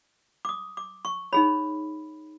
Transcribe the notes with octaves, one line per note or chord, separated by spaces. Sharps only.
D6
D#6
D6
C#6
D#4 G#4 C#5 B5